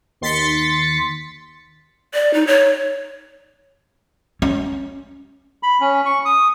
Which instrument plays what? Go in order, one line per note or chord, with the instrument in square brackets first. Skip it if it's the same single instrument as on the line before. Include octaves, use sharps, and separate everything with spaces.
[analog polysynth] D#2 C6 A6 B6 C#7
[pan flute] D5
D#4
C#5
[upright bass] C#4
[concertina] B5
C#4
C#6
D#6